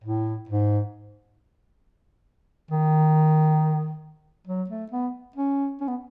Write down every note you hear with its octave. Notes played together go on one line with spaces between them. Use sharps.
A2
G#2
D#3
F#3
A3
B3
C#4
C#4
B3